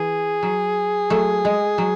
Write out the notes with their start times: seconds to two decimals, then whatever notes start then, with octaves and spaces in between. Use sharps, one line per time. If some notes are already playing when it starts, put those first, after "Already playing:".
Already playing: E3 G#4
0.43 F#3
1.10 F#3 A3
1.45 G#3
1.78 F#3